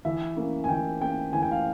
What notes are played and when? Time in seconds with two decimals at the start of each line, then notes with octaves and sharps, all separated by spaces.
0.05 E3 E5
0.37 A#3 C#4
0.64 G#5
0.69 E3 G5
1.01 A#3 C#4 G5
1.33 E3 G#5
1.43 G5
1.52 F5